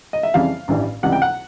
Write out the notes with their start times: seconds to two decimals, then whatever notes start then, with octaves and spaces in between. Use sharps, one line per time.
0.13 D#5
0.23 E5
0.34 F2 C#3 E3 G3 F5
0.68 A1 G2 E3 G3
1.03 C#2 C3 E3 G3 F#5
1.12 G5
1.22 F#5